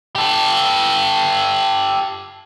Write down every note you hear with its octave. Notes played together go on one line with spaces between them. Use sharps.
G4 A4